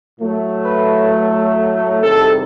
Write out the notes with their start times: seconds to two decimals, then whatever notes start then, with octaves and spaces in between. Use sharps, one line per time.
0.19 A2 F#3 A3
0.65 B4
2.02 E2 C3 D#3 G3 A4